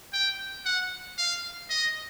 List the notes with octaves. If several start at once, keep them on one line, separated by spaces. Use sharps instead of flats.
G5
F#5
F5
D#5